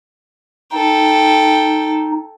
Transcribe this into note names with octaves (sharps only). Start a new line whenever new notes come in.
D#4 A4 G5